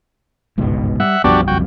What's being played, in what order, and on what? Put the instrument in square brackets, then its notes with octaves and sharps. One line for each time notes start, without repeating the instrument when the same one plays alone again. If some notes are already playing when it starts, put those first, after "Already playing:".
[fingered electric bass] G1 C#2 [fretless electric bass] G#2 B2
[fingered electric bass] G3 [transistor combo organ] E5 F#5
[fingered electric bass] B1 F#2 G3 [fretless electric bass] F3 B3 [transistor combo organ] D4 F#4 G4
[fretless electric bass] F#1 F2 [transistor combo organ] F#4 G5